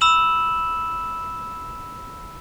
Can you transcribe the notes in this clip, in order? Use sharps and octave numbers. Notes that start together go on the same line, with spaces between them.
B5 E6 E7 F#7